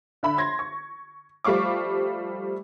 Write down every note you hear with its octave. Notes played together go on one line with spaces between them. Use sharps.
D3 E5 B5
C6 G#6 A#6
C#6
F3 G3 A3 F5 C#6 D6